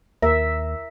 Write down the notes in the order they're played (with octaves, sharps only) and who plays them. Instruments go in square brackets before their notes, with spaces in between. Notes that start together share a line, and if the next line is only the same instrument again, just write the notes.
[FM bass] D#2 [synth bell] A#4 [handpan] E5